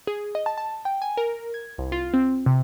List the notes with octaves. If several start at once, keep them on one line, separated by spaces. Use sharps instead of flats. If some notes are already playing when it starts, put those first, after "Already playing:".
G#4
D#5
A5
A5
G5
G#5
A#4
G#6
C2
F4
C4
C3